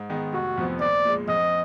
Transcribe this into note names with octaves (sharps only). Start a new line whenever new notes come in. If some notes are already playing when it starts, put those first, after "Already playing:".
Already playing: G#2
D#3 G#3 B3
F1 F#4
F2 F3 B3
A#1 D5
A#2 G#3
F2 D#5